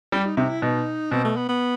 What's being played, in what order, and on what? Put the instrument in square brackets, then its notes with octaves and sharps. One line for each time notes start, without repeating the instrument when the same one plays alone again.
[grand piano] G3 [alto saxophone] G4
[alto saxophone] D#4
[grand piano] C3 [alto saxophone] D#4
[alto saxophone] E4
[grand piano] B2 [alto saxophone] D#4
[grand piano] B2 [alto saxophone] C4
[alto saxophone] A3
B3
B3